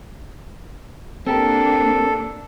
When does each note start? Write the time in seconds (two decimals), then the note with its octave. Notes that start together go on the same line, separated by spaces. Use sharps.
1.27 A#3 C4 D4 G4 A4 A#4